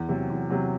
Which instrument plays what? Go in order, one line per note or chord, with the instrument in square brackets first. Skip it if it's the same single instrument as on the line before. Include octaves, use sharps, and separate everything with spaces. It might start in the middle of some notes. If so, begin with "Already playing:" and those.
Already playing: [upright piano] E2
C3 F#3
E2
C3 F#3